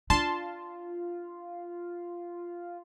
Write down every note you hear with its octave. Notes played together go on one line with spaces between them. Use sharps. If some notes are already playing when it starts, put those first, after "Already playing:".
D4 F4 A5 C6